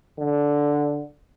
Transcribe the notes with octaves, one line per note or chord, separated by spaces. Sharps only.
D3